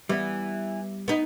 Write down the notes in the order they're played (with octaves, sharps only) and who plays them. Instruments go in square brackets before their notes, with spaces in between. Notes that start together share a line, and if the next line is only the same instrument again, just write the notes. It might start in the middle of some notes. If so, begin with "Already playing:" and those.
[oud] E3 [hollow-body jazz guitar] G3 B3
[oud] B3 D#4